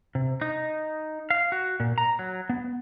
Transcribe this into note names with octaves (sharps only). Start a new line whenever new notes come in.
C3
D#4
F5
F#4
A#2
A#5
F#3
B3